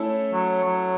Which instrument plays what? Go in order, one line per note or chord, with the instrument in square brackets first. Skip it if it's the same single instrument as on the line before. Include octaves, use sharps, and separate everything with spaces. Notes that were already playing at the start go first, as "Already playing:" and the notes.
Already playing: [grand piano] A3 C#4 E4 A4
[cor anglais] F#3
F#3